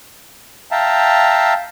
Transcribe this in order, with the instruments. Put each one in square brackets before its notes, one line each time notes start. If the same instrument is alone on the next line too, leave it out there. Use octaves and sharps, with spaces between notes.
[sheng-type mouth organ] E5 F5 G5 A5 A#5